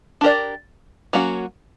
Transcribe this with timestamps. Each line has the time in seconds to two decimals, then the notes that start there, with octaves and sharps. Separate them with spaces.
0.21 D4 G4 A#4 D5
1.13 F#3 A#3 C#4 F#4